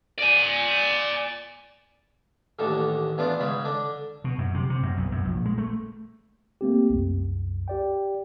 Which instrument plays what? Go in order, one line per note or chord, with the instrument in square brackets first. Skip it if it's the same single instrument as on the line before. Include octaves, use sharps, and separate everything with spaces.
[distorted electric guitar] D5 G#5
[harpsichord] A1 D#2 D3 A4
E2 B3 D4 F4 D5
C#2 G#2 B5
D3 D4
[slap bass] B2
F#2
C3
C3
F#2
B1
F#2
A#1
G#3
A3
[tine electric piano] A3 A#3 C4 G4
C2 F#2
G4 D5 G5